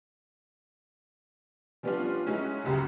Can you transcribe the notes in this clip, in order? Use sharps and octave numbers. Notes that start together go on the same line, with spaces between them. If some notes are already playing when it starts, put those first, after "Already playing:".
F3 G3 B3 C#4 D4 F4
F#3 G#3 C#4 D#4 E4 F#4
F#1 C#2 F#2 C#3 F#4 G4